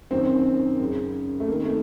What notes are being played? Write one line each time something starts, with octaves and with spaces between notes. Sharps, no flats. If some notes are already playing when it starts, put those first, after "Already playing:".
F#2 D#3 C4
F#2 C#3
A3
F2 D#3 A#3
A3